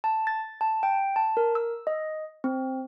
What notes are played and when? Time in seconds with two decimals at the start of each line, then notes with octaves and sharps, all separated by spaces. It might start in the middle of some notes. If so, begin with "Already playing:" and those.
0.04 A5
0.27 A6
0.61 A5
0.83 G5
1.16 A5
1.37 A#4
1.55 E6
1.87 D#5
2.44 C4